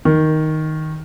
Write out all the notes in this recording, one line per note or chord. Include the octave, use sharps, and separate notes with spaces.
D#3